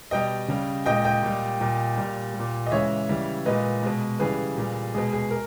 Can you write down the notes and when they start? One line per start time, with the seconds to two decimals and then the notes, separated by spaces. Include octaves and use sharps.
0.11 B2 G3 D#5 G5
0.48 C#3 G3
0.85 A#2 G#3 D#5 G5
1.05 D#5 G5
1.23 A#2 G3
1.61 A#2 G3
1.97 A#2 G3
2.34 G3
2.39 A#2
2.67 D#5
2.71 C#3 E3 G#3 C#5 E5
3.09 C#3 E3 G3
3.46 A#2 G#3 B4 D#5
3.83 B2 G#3
4.19 C#3 E3 G3 G#4 B4
4.57 A#2 G3
4.94 B2 G#3 G#4
5.13 G#4
5.31 A#4